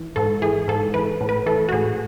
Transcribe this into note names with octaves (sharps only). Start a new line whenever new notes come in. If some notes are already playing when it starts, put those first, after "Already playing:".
Already playing: E3
G#2 A4
E3 G#4
G#2 A4
E3 B4
A2
B4
E3 A4
F#4
A2 G#4